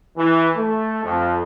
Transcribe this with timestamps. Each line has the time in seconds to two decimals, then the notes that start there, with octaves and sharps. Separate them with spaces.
0.17 E3
0.56 A3
1.04 F2